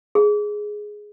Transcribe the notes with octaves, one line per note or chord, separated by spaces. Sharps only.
G#4